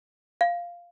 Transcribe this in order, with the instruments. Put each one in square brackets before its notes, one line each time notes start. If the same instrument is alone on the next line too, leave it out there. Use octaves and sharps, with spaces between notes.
[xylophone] F5